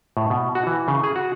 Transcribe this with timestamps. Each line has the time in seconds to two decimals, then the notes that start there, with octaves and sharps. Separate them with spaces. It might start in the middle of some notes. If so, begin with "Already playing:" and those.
0.17 A2
0.30 B2
0.55 F#4
0.67 E3
0.88 C#3
1.04 G#4
1.16 F#4